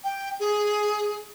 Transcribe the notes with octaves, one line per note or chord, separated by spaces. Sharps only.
G5
G#4